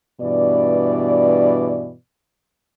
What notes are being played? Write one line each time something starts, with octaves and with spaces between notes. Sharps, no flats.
G2 B2 E3 D5